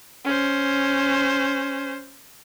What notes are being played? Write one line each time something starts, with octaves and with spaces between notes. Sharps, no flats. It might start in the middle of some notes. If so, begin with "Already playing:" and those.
C#4 C5